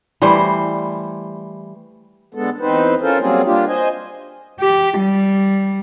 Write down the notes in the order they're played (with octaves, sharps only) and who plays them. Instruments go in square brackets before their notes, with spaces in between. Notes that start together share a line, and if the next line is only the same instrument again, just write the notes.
[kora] E3 G3 A3 C5
[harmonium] D3 G#3 B3 A4
E2 C4 D#4 B4 C5
C#4 F4 A4 A#4 C5
F#3 G3 A#3 C4 F4 G#4
G3 A#3 D4 F4 G4
C5 D#5 G#5
[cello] G4
G3